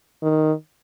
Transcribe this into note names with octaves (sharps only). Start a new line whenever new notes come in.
D#3